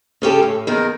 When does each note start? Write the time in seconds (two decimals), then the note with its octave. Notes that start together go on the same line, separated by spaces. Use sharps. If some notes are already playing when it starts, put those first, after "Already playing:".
0.22 C#3 C#4 G4 A4
0.43 A2
0.67 E2 D#3 A#4